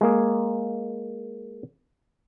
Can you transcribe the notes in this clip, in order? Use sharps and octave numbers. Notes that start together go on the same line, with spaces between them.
G#3 A#3 G#4